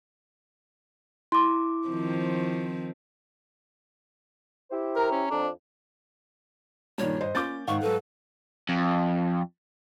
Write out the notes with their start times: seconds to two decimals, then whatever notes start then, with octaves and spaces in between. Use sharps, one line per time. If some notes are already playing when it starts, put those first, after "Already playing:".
1.32 E4 C6 D6
1.88 D#3 F3 C4
4.71 E4 G4 C5
4.96 A#4 A#5
5.11 C#4
5.31 F2 D4
6.98 G2 A#2 D#3 C#5
7.21 G2 C5 D#5
7.35 A#3 C#4 F4 D6 G6 A6
7.68 G#2 D#3 F5 F#5 C#6
7.82 G#2 F#3 A4 B4
8.69 F2